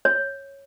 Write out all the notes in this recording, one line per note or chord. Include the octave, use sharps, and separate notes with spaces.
C#5